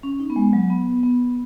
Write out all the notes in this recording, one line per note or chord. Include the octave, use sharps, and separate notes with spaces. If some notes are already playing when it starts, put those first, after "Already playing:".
C#4
D#4
B3
G#3
F#3
B3
B3